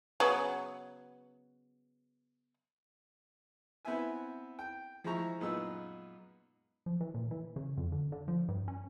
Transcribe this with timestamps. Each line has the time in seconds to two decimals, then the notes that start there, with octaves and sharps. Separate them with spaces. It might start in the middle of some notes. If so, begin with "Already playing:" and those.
0.20 C#3 F#3 B3
3.85 B3 C4 E4 E5 G#5
4.59 G5
5.04 F3 G#3 E4 A#5 C#6
5.40 F#2 A#2 G#3 B3 D#4 E6
6.86 F3
7.01 E3
7.14 A#2
7.31 E3
7.56 C#3
7.77 F2
7.92 D3
8.12 D3
8.28 F3
8.48 G2
8.68 C#4